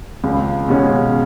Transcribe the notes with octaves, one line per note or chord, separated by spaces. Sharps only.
C#2
B2 G#3 C#4